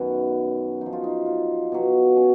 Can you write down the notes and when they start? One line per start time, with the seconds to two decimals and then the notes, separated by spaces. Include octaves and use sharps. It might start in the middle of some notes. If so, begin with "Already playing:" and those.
Already playing: F#2 D#3 F#3 B3 C#4
0.81 F#2 F3 D#4
0.93 F4
1.04 D#4
1.26 F4
1.72 B2 F#3
2.16 C#4